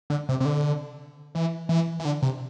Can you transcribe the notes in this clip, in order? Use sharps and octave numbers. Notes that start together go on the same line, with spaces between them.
D3
C3
C3
D3
E3
E3
E3
D3
C3